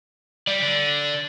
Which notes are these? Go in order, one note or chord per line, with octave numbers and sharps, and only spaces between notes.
G3 D5
D3